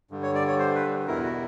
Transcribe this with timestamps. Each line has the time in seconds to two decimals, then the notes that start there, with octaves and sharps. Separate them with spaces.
0.11 G2 D3 G3
0.23 C#5
0.35 D5
0.47 C#5
0.59 C5
0.75 B4
1.07 E2 B2 G3 B3 E4 A#4
1.23 F#4